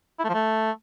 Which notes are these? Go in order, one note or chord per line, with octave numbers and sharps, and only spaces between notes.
E4
A3
F3
A3